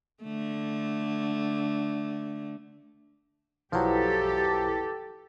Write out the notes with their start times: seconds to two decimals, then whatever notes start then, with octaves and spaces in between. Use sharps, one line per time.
0.24 D3 A3
3.72 B1 F3 F#3 E4 G4 A4 B4